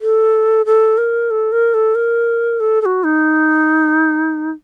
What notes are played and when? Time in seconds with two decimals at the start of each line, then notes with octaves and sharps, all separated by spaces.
0.01 A4
0.66 A4
0.98 A#4
1.31 A4
1.52 A#4
1.74 A4
1.95 A#4
2.60 A4
2.82 A4
2.85 F#4
3.04 D#4